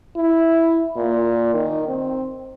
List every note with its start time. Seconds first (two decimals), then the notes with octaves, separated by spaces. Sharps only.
0.16 E4
0.97 A#2
1.54 D#3
1.88 C4